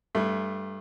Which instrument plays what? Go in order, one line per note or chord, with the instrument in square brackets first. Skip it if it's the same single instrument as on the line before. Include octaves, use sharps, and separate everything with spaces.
[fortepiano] G2 A3